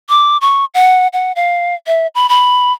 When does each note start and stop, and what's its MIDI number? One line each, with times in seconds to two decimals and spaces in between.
0.09 0.37 86
0.41 0.65 85
0.74 1.07 78
1.13 1.32 78
1.36 1.75 77
1.87 2.07 76
2.15 2.29 83
2.29 2.73 83